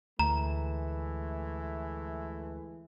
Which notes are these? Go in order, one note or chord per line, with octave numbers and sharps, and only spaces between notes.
D2 E3 G#3 A3 A#5